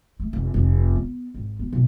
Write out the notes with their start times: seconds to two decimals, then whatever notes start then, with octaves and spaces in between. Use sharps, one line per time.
0.20 A3
0.33 F1
0.54 F1
0.96 B3
1.34 G#1
1.59 B3
1.73 B1